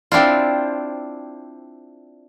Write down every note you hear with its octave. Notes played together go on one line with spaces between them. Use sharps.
C4 D4 E4 F4